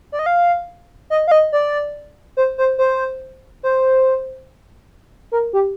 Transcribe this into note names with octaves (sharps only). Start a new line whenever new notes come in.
D5
D#5
F5
D#5
F5
D#5
D5
C5
C5
C5
C5
A#4
G4